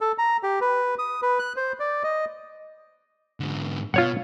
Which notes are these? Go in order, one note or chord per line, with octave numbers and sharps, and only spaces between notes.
A4
A#5
G4
B4
D#6
B4
F#6
C5
D5
D#5
G#2 D3
B2 F4 C#5 F#5